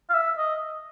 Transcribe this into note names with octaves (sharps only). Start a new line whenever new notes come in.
F5
E5
D#5